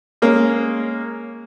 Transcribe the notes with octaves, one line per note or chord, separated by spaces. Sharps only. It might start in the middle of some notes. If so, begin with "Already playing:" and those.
G#3 A#3 C#4